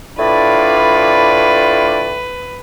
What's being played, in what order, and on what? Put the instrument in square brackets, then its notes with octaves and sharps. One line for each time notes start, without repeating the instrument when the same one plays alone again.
[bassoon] A2 [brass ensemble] D4 F4 D5 [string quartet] B4